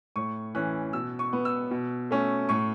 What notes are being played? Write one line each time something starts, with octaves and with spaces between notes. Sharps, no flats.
A2 C#6
E3 C#4 F#6
B2 E6
C#6
B3
E6
B2
A3 C#4
A2 C#6